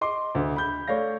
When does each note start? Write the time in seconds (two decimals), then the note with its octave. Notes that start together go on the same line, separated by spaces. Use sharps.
0.01 D#5 C6 D6
0.35 D2
0.56 B5 G6
0.87 A3 C#5 D5 F5 A#6